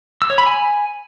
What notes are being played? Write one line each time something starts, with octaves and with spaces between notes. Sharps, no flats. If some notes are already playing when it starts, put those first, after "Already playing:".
E6
C#5
B5
G#5